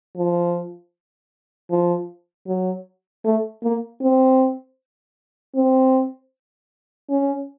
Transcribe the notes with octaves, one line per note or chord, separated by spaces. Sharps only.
F3
F3
F#3
A3
A#3
C4
C4
C#4